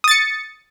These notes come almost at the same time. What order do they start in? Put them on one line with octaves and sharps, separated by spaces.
D#6 A6 C#7